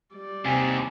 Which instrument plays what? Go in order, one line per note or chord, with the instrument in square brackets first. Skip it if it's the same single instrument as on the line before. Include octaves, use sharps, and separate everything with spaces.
[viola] G3 D5
[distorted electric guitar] D#2 [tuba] C3 [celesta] G#5